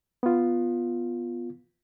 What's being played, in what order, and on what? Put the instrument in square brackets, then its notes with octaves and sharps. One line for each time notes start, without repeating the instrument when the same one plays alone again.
[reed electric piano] B3 F4